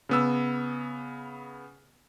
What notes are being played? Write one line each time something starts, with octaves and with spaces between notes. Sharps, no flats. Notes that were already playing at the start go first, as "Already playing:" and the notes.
C#3 B3 E6